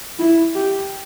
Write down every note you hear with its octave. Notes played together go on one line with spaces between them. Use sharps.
E4
G4